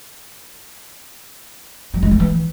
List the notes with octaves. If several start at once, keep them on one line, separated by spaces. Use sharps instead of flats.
F#3
G#3
A3
E3